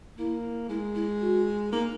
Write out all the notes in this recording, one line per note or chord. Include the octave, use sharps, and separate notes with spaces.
A#3 E4
G#3 E4
E4
F#4
A#3 D#4